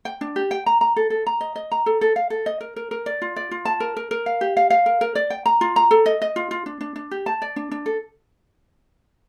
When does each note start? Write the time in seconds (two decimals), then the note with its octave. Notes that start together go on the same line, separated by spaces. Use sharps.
0.05 G5
0.21 D4
0.36 G4
0.51 G5
0.66 A#5
0.81 A#5
0.96 A4
1.10 A4
1.26 A#5
1.41 D#5
1.56 D#5
1.72 A#5
1.86 A4
2.01 A4
2.16 F5
2.30 A4
2.46 D#5
2.61 A#4
2.76 A#4
2.91 A#4
3.06 D5
3.22 F4
3.36 D5
3.51 F4
3.65 A5
3.80 A#4
3.97 A#4
4.11 A#4
4.26 F5
4.41 G4
4.57 F5
4.70 F5
4.86 A#4
5.01 A#4
5.15 D5
5.30 G5
5.46 A#5
5.61 F4
5.76 A#5
5.91 A4
6.06 D#5
6.22 D#5
6.36 F4
6.51 F4
6.66 D4
6.81 D4
6.96 D4
7.11 G4
7.26 A5
7.42 D5
7.56 D4
7.71 D4
7.86 A4